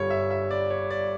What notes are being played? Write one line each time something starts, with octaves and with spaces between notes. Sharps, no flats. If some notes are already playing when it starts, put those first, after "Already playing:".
Already playing: G1 G2 D3 G3 C#5
E5
E5
D5
C#5
D5